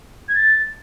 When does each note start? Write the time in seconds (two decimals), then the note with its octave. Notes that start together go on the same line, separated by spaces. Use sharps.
0.29 G#6
0.35 A6